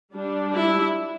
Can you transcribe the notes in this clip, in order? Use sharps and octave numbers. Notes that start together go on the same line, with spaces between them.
G3 D4
E4